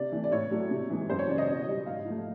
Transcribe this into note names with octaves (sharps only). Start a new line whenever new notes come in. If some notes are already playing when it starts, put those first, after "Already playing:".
Already playing: C3 D5
E3 A3
D5
A2 C#5
F#3 A3
C3
E3 G#3
F#2 C5
C#5
C#3 E3 D5
D#5
B2
G3
G#2 F5
F3 A3